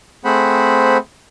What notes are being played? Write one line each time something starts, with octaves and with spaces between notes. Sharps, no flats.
A3 C4 G#4 C5 F#5 B5